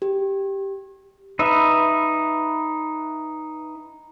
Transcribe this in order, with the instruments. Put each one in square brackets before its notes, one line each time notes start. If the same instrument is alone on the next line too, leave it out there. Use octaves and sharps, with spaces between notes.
[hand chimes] G4
[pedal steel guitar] D#4 B4 E5